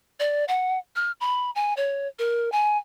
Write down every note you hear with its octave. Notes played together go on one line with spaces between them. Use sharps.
D5
F#5
F6
B5
G#5
C#5
A#4
G#5